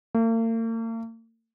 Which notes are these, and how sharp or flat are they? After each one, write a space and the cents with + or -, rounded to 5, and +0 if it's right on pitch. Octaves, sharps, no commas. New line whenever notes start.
A#3 -45